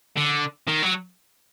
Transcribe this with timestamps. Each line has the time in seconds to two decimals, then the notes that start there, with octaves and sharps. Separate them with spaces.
0.17 D3
0.67 D#3
0.82 F#3